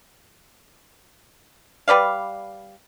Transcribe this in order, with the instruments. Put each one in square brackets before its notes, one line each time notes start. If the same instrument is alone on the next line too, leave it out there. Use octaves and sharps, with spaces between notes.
[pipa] G3 B4 D5 F5